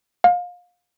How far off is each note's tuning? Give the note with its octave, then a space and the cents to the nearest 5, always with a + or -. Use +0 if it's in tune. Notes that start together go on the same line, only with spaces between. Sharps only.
F5 +30